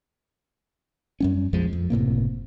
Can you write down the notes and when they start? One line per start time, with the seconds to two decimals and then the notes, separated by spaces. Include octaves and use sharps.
1.20 F#2 G3 C#4
1.53 A#1 F2 F3 G#3
1.73 F2
1.90 F#1 A2 C3 A#3